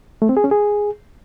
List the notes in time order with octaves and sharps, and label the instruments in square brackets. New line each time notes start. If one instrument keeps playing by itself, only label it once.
[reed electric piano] A3
C4
G#4
C#4
G#4